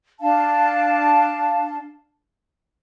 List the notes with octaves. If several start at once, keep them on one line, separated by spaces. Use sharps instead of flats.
D4 F5 A5